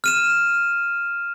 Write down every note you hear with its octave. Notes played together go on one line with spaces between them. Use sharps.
F6 D#7 E7